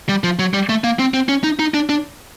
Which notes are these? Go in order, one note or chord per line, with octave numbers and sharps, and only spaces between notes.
G3
F3
F#3
G3
A3
A#3
C4
C4
C#4
D#4
D#4
D4
D4